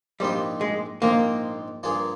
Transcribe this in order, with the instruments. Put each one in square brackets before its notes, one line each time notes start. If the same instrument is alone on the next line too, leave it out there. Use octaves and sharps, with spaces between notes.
[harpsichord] A#1 G#2 F3 C4 F4 [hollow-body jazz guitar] G3
[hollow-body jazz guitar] G#3
[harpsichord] A#1 G#2 F3 C4 F4 [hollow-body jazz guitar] A#3
[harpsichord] G2 F3 A#3 F4 G#4